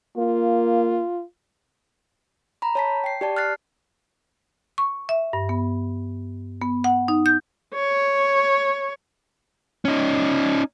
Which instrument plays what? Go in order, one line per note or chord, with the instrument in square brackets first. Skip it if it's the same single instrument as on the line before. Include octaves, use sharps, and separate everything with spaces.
[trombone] A#3 [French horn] F4
[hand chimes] A#5 B5
C#5 A5 B6
G5 C7
G4 D5 A5
F6 F#6 A6 C7
[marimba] C#6
E5
G2
B3
B3
F#5
D#4
G6
[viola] C#5
[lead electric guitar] C#4 D#4